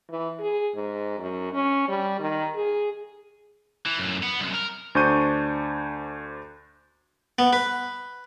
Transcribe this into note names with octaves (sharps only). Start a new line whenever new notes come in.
E3
G#4
G#2
F#2
C#4
G3
D#3
G#4
E3
F#2 A2
B3
C2 F#2
A#4
D2 D4 C5 C#6 G6 D#7
B3
B4